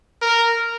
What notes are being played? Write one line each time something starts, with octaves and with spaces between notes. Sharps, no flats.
A#4